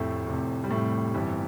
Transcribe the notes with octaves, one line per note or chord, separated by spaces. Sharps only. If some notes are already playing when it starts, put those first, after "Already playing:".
Already playing: F1 F2 A2 C3 A3
F1 F2 C3
G3
A2 A3
G1 F2 E3 G3